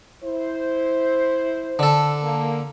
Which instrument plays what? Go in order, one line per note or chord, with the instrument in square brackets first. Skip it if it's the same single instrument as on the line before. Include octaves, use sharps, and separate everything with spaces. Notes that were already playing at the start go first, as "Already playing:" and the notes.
[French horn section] E4 C5
[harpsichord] D3 A4
[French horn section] A#3